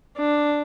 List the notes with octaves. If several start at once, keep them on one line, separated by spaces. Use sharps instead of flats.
D4